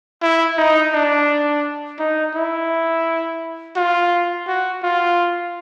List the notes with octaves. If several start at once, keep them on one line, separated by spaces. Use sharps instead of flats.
E4
D#4
D4
D#4
E4
F4
F#4
F4